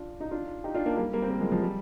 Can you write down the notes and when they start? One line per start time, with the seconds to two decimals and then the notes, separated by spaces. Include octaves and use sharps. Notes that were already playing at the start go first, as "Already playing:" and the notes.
Already playing: D4 F4
0.21 D#4
0.31 D4 F4
0.64 D#4 G4
0.75 D4 F4
0.86 A#3 D4
0.96 G3 A#3
1.13 G3 A#3
1.22 C4
1.30 G3 A#3
1.41 F3 G#3
1.52 F3 G#3
1.63 G3